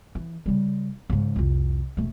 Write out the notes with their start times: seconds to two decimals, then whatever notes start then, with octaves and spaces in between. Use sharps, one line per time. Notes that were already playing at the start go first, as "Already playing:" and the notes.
0.15 E3
0.46 C#3 G3
1.10 G#2 C#3
1.36 C2 F2
1.97 E1 A3